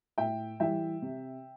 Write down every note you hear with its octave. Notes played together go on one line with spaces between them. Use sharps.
A2 E5 G5
E3 G3 E5 G5
C3